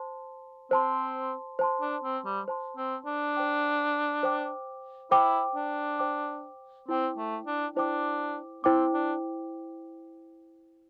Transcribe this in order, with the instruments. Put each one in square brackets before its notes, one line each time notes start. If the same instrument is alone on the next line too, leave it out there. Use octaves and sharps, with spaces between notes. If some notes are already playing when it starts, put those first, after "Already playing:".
Already playing: [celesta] C5 A5 C6
[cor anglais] C4 [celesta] C5 A5 C6
[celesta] C5 A5 C6
[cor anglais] D4
C4
G3
[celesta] C5 A5 C6
[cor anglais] C4
D4
[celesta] C5 G5 D6
C5 G5 D6
[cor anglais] E4 [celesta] C5 G5 D6
[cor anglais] D4
[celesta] C5 G5 D6
[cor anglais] C4 [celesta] E4 C5 G5 D6
[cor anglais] A3
D4
[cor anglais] D4 [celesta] E4 C5 G5 D6
[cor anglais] C4 [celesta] E4 C5 G5 D6
[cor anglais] D4